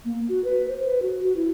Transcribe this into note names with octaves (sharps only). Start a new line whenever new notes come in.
A#3
F#4
B4
C5
B4
F#4
F#4
E4